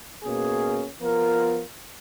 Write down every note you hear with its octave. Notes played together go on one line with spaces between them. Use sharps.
B2 A#3 C#4 G#4
F3 B3 F4 A#4